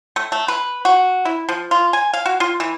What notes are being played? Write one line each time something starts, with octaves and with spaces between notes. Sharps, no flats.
A3
A3
B4
F#4
E4
F3
F4
G#5
F5
F#4
F4
E3